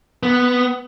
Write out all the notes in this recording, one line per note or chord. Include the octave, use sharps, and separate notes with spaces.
B3